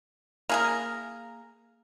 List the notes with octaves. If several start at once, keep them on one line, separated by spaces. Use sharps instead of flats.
A#3 G#4 A#4